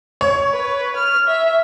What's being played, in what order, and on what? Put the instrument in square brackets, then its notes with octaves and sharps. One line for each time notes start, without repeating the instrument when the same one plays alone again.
[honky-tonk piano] C#5
[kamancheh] B4
F6
E5